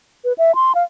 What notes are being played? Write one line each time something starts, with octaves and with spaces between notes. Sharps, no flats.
B4
E5
C6
F5